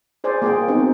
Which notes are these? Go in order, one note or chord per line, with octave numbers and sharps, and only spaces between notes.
G#4 C5 D5 G#5
A#3 G#4 G5
B3 C4 D#4 F#4